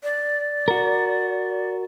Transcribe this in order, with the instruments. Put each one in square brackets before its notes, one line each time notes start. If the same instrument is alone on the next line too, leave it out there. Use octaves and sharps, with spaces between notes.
[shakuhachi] D5
[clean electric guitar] F#4 A#4